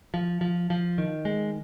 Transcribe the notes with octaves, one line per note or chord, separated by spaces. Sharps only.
F3
F3
F3
D#3
G#3